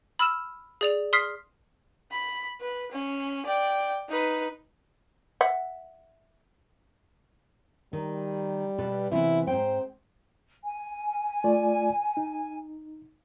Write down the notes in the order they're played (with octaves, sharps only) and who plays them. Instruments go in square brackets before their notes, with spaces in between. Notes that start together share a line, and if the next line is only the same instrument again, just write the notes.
[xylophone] B5 E6 F6 E7
G#4 D5 F7
C6 D#6 F6 B6 C7
[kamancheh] B5
B4
C#4
D5 G5
D#4 B4
[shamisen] E5 F#5
[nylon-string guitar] D#3 [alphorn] G3
[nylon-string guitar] B2 A4 B4
[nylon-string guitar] C3 E3 B3 [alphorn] E4
[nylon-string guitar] G#2 C4 G5 [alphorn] C5
[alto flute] G#5
[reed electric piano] A3 F4 D5
D#4